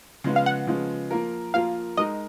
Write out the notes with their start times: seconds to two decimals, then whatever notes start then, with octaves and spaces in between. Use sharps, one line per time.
0.24 C#3 F3 G#3 B3 F4
0.36 F5
0.46 F#5
0.67 C#3 F3 G#3 B3 F4
1.11 F3 A#3 F4 A#4
1.54 F3 A#3 F4 A#4 F5
1.97 G#3 D#4 A#4 D#5